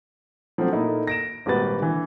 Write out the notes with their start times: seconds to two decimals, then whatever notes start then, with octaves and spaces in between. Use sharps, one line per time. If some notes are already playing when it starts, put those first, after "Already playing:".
0.58 F3 F#3 A3 C4 D4
0.73 A#2 A3 D#4 E4
1.07 A#6 D7 E7
1.46 G#1 A#2 G3 B4 A6
1.79 D3 E3